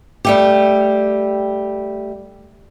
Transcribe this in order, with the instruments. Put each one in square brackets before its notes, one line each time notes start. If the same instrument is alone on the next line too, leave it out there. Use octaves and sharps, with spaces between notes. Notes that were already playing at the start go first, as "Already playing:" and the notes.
[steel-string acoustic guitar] G3 A3 G4